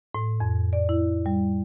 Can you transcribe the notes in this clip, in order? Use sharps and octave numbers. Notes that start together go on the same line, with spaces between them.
A2
F2
D5
E4
G3